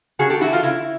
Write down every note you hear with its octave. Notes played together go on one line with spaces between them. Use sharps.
C#3 F#4 G#4
G4 A4
E3 A3 E4 F#4
F4
C#3 E4